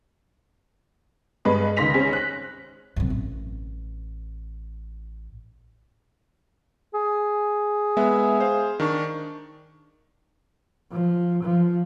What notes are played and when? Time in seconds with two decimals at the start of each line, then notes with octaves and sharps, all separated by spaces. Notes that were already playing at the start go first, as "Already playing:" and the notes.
1.45 G2 G#3 B4 D#5
1.77 C#2 D#3 C6 A#6 B6 F7
1.94 C#4 G#4 C5
2.13 F#6 B6
2.96 F#2 C3
3.10 A1
6.94 G#4
7.97 G#3 B3 E5
8.40 C5 F5
8.80 D#3 D4 C#6
10.92 F3
11.43 F3